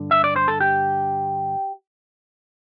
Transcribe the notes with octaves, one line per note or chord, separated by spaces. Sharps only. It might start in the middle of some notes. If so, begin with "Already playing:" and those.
Already playing: G2 D3
E5
D5
C5
A4
G4